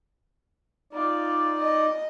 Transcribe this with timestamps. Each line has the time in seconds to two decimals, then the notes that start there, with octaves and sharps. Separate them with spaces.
0.93 D#4 F4 D5
1.57 D#5